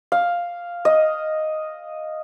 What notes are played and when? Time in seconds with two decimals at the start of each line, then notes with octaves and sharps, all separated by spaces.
0.12 F5
0.85 D#5